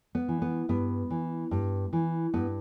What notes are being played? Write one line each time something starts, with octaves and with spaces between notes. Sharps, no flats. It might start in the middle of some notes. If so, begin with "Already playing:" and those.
B3
E3
B3
G2 B3
E3
G2
E3
G2 B3